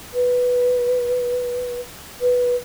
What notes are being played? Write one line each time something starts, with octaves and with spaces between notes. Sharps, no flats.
B4
B4